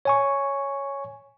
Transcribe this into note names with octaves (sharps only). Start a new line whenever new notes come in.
C#5 G#5 C#6